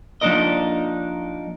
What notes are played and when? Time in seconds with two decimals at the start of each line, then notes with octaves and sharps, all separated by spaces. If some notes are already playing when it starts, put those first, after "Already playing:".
0.21 F3 A#3 D4 D#4 A#4 D#5